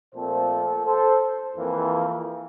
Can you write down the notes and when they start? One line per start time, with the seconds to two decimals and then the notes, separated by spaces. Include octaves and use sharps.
0.15 A#2 F3 A3 C4 A4 C5
0.85 A4 C5
1.56 F2 E3 A#3